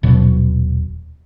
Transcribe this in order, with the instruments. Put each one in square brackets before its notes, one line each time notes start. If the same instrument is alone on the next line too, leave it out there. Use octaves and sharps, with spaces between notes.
[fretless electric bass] D#1 B2 F#3